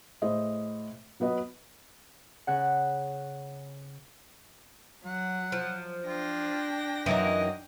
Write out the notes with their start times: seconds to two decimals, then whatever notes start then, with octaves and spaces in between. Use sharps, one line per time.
0.22 A2 G#4 C5 D#5 E5
1.20 F#3 B3 B4 D#5
2.47 C#3 F#5
5.06 F#3 F#5
5.52 F3
6.07 D4 F4 G5 A#6
7.06 F#2 E3 F#3 A#3 D#4 D#5